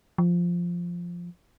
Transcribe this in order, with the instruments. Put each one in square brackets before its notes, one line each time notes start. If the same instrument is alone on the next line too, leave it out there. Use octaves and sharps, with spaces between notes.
[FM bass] F3